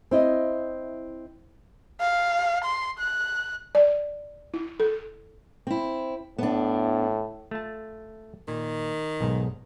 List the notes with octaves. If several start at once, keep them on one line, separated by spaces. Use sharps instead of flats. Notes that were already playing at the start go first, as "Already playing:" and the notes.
C4 E4 D#5
F5
C6
F#6
D5
E4
A4
C4 E4
A2 B3 D4
A3 F4 A5
A#2 D#3
B1 G#2